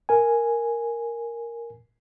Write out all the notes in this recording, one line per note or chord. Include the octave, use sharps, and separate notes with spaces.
A#4 G#5